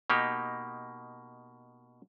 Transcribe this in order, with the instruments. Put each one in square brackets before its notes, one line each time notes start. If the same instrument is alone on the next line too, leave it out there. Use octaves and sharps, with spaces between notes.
[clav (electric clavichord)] B2 A#3 D#4 G4